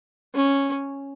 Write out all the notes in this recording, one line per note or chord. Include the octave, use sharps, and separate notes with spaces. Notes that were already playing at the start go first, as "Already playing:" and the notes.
C#4